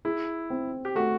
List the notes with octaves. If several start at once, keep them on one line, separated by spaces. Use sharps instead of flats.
E4 G#4
C4
G4
A3 F#4